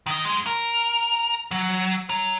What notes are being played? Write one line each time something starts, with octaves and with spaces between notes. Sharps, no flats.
D#3 D#5
F#2 G#3
A#4
F#3
C#5 A#5